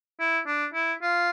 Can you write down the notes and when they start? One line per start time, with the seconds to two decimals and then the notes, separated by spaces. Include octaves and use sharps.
0.20 E4
0.47 D4
0.74 E4
1.02 F4